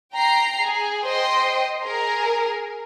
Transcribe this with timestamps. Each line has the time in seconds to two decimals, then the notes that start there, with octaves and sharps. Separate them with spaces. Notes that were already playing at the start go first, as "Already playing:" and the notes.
0.15 G5 A#5 C7
0.63 G#4
1.05 C5 D#5 G5 C6
1.86 G#4 A#4